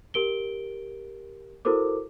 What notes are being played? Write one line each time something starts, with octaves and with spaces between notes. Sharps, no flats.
G4 A#4 D7 G7
E4 F#4 A4 A#4 C5 D6